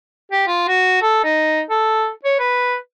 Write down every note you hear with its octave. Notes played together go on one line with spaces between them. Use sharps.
G4
F4
F#4
A4
D#4
A4
C#5
B4